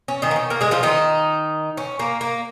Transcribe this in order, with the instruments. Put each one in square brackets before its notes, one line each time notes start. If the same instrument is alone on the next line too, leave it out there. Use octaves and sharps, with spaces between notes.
[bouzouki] C#4
D#3 D#4
A#3
C#4
A#3 A#4
G#3 G#4
F3 F4
D#3 D#4
C#4
A#3
A#3